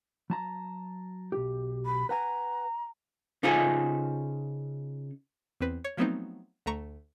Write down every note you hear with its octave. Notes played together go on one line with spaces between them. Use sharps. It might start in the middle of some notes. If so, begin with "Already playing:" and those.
F#3 A5 A#5
B1 G4
B5
B4 F#5 G#5 A#5
C#3 D#4 F4 A4 C5 G#5
E2 C4 B4
C#5
F3 F#3 A3 B3 C4 D#4
D2 A3 A#5 C#6